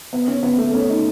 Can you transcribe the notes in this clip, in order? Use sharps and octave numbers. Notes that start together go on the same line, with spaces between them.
B3
C#4
B3
A3
C#4
D#4